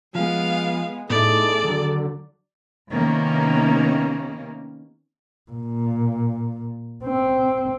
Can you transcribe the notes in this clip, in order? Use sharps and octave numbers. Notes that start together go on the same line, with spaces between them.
F3 G#3 B3 F5
A2 B3 D#4 E4 G#4 A4 D5
D#2 D3 F#3
C3 D#3 A#3 B3 C#4
A#2
C4